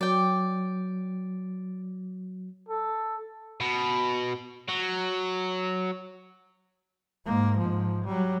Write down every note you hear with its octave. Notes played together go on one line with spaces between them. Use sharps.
F#3 D5 G5
A4
B2
F#3
G#2 A#3
G#2 F3
F#3 G3